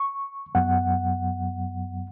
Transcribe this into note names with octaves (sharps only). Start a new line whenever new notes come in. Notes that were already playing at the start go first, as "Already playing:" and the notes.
Already playing: C#6
F#2 F#3 B3 F#5